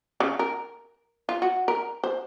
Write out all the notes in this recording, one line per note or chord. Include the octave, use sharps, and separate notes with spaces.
C#3
A#4
F4
F#4
A#4
C5